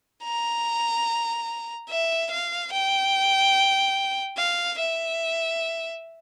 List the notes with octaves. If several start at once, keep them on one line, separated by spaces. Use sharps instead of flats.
A#5
E5
F5
G5
F5
E5